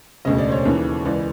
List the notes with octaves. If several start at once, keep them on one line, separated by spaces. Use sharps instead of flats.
E1 D2 C#3 D#5
D5
C5
C#5
D#2 C#3 E3
C#2 C#3 E3 D5